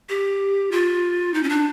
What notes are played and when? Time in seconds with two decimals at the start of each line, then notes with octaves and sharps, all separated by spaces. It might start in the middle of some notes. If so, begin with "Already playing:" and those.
0.09 G4
0.71 F4
1.34 D#4
1.43 C#4
1.49 D4